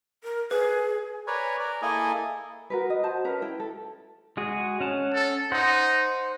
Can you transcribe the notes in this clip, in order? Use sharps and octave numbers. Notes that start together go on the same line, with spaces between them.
A#4
G#4 B4
A#4 B4 C#5 D5 G#5
A#4 D5
A#3 E4 G#4 A4 D#5 G#5
F#4 A#4 B4
D#5
F#4 C5 A5
C#4 A#4 B4
E4 G5
A4
G#3 F#4 G#4
C#4 F#5 A5
A4
D#4 C5 F#5